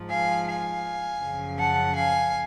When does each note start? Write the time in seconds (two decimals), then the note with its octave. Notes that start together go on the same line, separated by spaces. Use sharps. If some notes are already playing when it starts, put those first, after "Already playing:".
Already playing: G#2 F3
0.10 F5 G#5
0.47 F5 G#5
1.21 F#2 C#3 F3
1.57 F#5 A5
1.95 F5 G#5